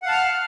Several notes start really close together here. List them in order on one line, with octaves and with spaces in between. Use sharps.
F#5 F5 A5 F6 F#6